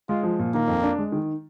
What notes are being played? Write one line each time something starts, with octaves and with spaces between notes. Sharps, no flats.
G#3 F4
F3
A#2
D#3 A#3
F2
D4
G#3
D#3